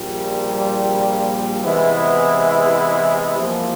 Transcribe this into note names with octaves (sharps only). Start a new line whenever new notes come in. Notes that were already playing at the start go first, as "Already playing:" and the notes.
Already playing: A#1 A#2 G3
C3 E3 G#3 B3 E4
C2 C3 F3 A#3